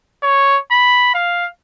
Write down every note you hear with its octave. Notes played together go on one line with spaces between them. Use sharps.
C#5
B5
F5